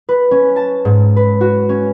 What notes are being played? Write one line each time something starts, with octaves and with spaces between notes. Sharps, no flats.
B4
C#4
A5
G#2
B4
F#4
C#4